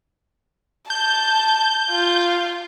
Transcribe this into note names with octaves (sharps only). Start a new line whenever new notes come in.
A5 G6
F4